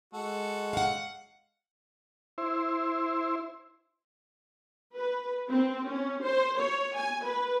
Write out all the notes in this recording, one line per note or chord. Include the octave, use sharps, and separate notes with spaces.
G#3 F#4 A4
F5 F#5
E4 C5
B4
C4
C#4
C5
C#5
G#5
B4